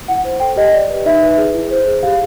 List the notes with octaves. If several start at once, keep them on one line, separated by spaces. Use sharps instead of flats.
E4 F#5
C5
A4 G5
G4 D#5
D5
B4
D#4 E5
B4
G#4
E4
C5
G#4
G4 F5